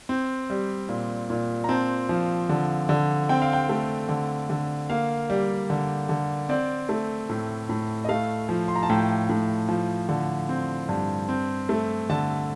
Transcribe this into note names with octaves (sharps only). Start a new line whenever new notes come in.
C4
G3
A#2
A#2
A#5
C4 A5
F3
D3
D3
C4 G5
F5
G5
A3
D3
D3
A#3 F5
G3
D3
D3
C4 D5
A3
A2
A2
D#5
A3 F5
F3
C6
A#5
A5
A2 G5
A2
F3
D3
C4
G2
C4
A3
D3 A5